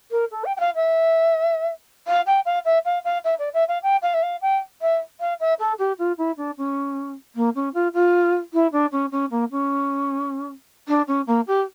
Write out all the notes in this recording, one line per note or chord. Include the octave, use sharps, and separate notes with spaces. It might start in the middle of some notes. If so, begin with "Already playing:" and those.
A#4
A4
G5
G5
F5
E5
F5
G5
F5
E5
F5
F5
E5
D5
E5
F5
G5
F5
E5
F5
G5
E5
F5
E5
A4
G4
F4
E4
D4
C#4
A#3
C#4
F4
F4
E4
D4
C#4
C#4
A#3
C#4
D4
C#4
A#3
G4